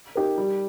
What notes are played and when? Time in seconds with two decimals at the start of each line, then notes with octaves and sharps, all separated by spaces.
0.15 D#4 G4 A#4
0.38 G3